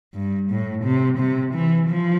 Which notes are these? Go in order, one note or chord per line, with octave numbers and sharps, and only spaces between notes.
G2
A2
C3
C3
E3
F3